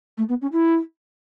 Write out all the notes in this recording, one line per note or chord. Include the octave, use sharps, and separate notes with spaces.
A3
B3
C#4
E4